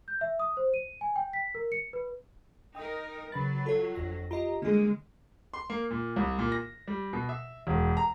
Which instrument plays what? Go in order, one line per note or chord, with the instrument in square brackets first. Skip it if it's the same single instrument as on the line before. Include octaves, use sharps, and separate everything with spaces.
[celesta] G6
E5
D#6
C5
D#7
G#5
G5
B6
A#4
C#7
B4
[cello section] D#4 A#4 [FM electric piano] G5 D#6
[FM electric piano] C#3 B5 A6 [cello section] F#3 [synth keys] B4
[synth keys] F4 C#5 [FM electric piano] A4
[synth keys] G1 F2 A#6
[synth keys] F4 G4 D#5 [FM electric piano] A#5
[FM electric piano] D3 G#4 [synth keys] G3 A#3 [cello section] G#3
[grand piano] C6
A#3
A#2
C2
A#2
A#6
G3
B2
E5
E1
A#5